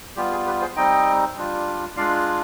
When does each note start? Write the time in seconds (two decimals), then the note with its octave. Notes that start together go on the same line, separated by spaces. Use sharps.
0.16 G3 B3 F4 G4
0.32 G#4
0.46 G4 B4
0.61 G#4 C5
0.76 G3 C4 D#4 D#5 G5
1.36 G3 D4 F4
1.97 G#3 D4 F4 D5 F5